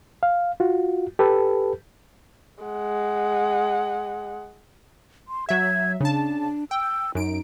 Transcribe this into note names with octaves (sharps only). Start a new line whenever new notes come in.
F5
F4 F#4
G4 A4 B4
G#3 F#5
C6
F#3 E5 G#6
C#3 D4 A5
G5 E6
F#2 D#4 D7